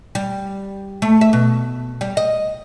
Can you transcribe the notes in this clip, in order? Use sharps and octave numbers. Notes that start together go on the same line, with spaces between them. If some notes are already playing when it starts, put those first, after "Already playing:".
G3
A3
E5
B2
G3
D#5